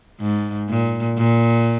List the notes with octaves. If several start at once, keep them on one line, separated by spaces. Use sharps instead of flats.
G#2
A#2
A#2